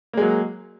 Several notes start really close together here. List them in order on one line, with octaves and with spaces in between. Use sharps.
A#3 G#3 F#3